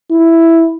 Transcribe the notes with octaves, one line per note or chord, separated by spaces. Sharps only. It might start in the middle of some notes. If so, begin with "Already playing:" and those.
E4